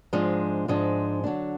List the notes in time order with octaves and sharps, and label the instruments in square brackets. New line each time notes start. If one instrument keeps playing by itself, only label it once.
[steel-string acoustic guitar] G#2 F3 G#3 D4
G#2 F3 G#3 D4
D3 F#3 D4